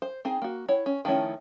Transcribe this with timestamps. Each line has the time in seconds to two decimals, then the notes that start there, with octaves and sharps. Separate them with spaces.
0.02 C5
0.25 C4 D#4 G#4
0.42 A#3 F#4
0.68 E4 C#5 F#5
0.86 C#4
1.05 D#3 F3 A3 C#4 E4